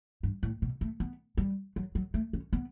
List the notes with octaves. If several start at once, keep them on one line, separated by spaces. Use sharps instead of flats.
G2
A2
B2
A3
B3
G3
F#3
F#3
A3
C#4
B3